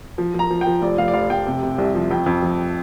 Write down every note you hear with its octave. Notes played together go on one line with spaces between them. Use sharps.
F3
F3 A#5
F3
G5
F3
F1 D5
F1 F5
D5
F1 F5
F1 G5
C3
C3
C2
F3
F2 G5
F2
F3